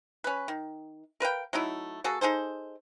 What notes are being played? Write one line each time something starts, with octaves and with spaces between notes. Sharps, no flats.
C#4 B4
D#3
A#4 B4 F5 G5
F#3 A3 D#4 E4
A#3 F#4 G#4 A4
D#4 G#4 A4 C5